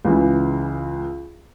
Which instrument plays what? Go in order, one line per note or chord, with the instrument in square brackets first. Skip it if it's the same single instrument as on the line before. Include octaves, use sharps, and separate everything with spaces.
[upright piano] C#2 C#3 E3